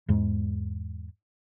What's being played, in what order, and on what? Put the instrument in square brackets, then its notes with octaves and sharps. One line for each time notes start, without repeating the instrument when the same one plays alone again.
[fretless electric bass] E2 G#2 G#3